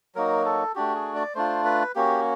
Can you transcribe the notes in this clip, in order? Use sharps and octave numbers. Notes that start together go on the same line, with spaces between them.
F#3 A#3 D#4 F#4 A#4
A4
A3 D4 F#4 G4
G#4
D5
A3 D4 F4 C5
B4
A#3 C#4 F#4 G4